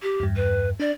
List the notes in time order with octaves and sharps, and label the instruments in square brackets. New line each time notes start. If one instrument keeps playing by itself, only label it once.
[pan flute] G4
[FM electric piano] E2 G2
[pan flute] B4
[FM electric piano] D4 [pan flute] D5